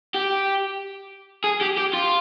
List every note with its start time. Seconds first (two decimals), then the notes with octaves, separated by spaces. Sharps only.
0.14 G4
1.44 G#4
1.61 G4
1.78 G4
1.93 F4